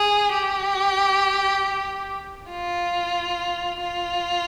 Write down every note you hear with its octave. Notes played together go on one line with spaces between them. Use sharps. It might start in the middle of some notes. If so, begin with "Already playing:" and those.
Already playing: G#4
G4
F4
F4